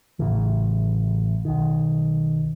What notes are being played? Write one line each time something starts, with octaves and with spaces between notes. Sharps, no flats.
A1 C#3 E3
B1 D#3